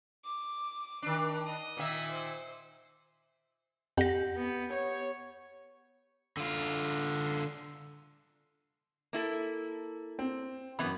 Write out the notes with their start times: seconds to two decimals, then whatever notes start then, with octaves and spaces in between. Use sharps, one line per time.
0.25 D6
1.02 D#3 D4
1.46 D#5
1.77 A#2 D#3 E5
2.11 C5
3.97 F2 G4 F#5 G6 A#6
4.37 B3
4.74 C#5
6.37 D3 F4
9.13 A#3 E4 A4
10.19 C4
10.79 F#2 E3 B3 B5